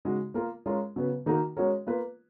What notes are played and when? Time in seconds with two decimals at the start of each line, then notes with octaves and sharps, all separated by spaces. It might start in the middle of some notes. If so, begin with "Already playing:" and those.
0.05 C#3 G#3 D#4 F#4
0.34 A#3 F4 A#4
0.66 G#3 C#4 F4 A#4
0.96 C#3 F#3 B3
1.26 D#3 A#3 D#4 F#4 A#4
1.57 G#3 C#4 F#4 A#4 C#5
1.87 A#3 F4 B4